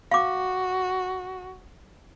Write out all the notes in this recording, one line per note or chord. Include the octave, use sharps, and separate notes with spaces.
F#4 F5 D6